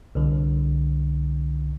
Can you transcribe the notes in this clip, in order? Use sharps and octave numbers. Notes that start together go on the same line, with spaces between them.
C2 D3